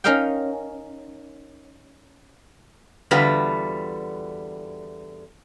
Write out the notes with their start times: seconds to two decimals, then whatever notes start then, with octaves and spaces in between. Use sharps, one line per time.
0.04 C#4 D#4 A#4 D#5 F5 G5
3.11 E2 D3 G3 F4 F#4 B4